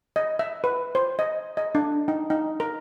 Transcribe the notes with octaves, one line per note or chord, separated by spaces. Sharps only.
D#5
E5
B4
C5
D#5
D#5
D4
D#4
D#4
A#4